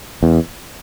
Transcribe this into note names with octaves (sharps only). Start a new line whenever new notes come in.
E2